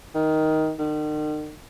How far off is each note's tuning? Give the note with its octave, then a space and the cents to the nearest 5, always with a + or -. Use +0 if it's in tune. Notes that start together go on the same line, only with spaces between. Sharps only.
D#3 +10
D#3 -40